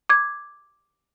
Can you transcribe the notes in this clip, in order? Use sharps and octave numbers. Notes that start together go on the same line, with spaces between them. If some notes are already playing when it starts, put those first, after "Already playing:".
D6 G#6